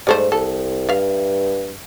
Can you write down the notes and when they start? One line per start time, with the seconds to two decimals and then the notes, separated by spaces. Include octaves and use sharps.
0.07 G#2 G3 A3 C5
0.32 C2 A4
0.89 G2 E5 F5